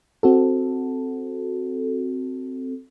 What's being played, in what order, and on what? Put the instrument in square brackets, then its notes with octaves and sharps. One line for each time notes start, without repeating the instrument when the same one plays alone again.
[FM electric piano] C4 F#4 A4